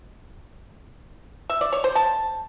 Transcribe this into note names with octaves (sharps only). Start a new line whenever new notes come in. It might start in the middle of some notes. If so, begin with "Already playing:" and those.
E5
D5
C#5
C5
A5